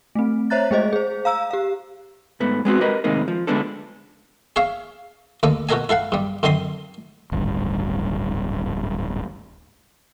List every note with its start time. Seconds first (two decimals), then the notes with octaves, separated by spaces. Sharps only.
0.15 A3 C4
0.50 C5 C#5 E5 A#5 F#6 A6
0.71 G#3 A3 G#4 C5 D#5
0.93 G#4 C5
1.25 F5 A#5 E6
1.51 G4 F5
2.40 G#2 A3 B3
2.65 G#3 B3 C4 F#4
2.81 G4 A#4 B4 D#5
3.04 A2 C3 D#3 G#3 A#3 D#4
3.28 F3
3.47 D3 G#3 A3 B3 D4 A4
4.56 G#4 C#5 E5 F5
5.43 D2 A#3 A4 D#5
5.69 B2 F#4 A4 A#4 D#5 G#5
5.89 E4 A4 F5 F#5
6.12 G2 G3
6.43 F#2 D3 C4 D#5 C6 D#6
7.32 D1 G#1 G2